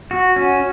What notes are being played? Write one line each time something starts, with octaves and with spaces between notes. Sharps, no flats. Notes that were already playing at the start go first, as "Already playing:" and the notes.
F#4
C#4